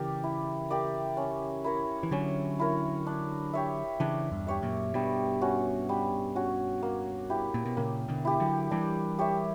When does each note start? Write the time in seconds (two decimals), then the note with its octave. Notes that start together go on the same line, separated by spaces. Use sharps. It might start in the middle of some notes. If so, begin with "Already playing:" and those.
Already playing: C#3 E3 G4 A#4 D5
0.24 E4
0.71 G4 A#4 D5
1.17 C#4
1.64 E4 A#4 C#5
2.03 E3
2.11 D3 F#3 C#4
2.59 E4 A#4 C#5
3.07 D4
3.53 G4 C#5 E5
4.00 C#3 E3 D4
4.31 E2 G2
4.47 G4 C#5 E5
4.62 F#2 A#2
4.94 G2 B2 G3
5.41 C#4 F#4
5.89 G3
6.35 C#4 F#4
6.82 A#3
7.30 E4 G4
7.54 A#2
7.66 B2
7.77 A#2 C#3 A#3
8.09 B2 D3
8.25 E4 G4
8.40 D3 F#3
8.71 E3 G3 D4
9.19 G4 C#5 E5